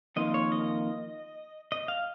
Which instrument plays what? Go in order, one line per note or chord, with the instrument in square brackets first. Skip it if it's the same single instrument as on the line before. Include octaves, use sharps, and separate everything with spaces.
[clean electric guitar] F2 D#3 A#3 F4 [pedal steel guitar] D#5
[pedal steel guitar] C#5
D#5
D#5
F5